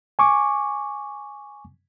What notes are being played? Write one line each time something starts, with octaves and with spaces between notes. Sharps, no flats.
G#5 C#6 D6